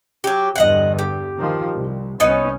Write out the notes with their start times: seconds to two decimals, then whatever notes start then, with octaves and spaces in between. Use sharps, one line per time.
0.24 F#3 G4
0.56 E2 G2 D3 D#5 F5 F#5
0.99 G4
1.38 D#3 F3
1.73 C2
2.20 C2 B3 C#4 D#4 C#5